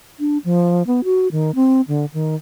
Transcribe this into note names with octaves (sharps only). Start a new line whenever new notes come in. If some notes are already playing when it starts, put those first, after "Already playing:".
D4
F3
B3
F#4
D#3
C4
D3
D#3